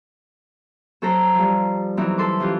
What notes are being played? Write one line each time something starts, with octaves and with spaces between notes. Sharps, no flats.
F#3 C4 A4 C5 A#5
F3 G3
E3 F#3 B3 C4 D#4 E4
A4 C6 D6
E3 C#4 F4 G4